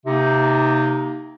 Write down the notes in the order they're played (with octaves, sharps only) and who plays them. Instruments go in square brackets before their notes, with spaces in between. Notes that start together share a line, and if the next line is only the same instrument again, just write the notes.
[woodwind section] C3 A#3 D#4